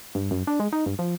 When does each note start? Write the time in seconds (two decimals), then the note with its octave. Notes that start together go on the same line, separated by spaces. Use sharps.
0.15 G2
0.31 F#2
0.47 D4
0.60 G#3
0.73 D#4
0.86 G2
0.99 F3